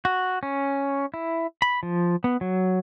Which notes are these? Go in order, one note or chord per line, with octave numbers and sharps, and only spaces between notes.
F#4
C#4
E4
B5
F3
B3
F#3